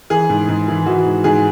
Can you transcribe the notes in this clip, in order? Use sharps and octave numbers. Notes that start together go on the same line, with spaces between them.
E3 G#4
G#2
G#2
E3
E3 F#4
G#2
G#2 G#4